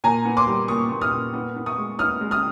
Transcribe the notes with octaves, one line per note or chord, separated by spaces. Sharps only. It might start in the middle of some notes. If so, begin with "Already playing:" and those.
A#2 G#5 A#5
B3
C6 D6
G3
A#2 C#6 D#6
A#2
D#6 F6
A#2
B3
B3
C#6 D#6
G#3
B3 D#6 F6
G#3
D#6 F6